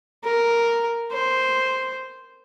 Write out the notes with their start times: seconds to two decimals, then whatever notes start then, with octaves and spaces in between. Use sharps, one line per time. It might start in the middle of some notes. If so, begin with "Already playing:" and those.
0.24 A#4
1.12 C5